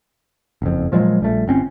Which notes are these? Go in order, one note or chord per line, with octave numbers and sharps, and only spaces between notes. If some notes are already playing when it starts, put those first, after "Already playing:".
F#1 F2
A#2 F3 F#3 G#3
A#1 G3 A3
G1 C4 C#4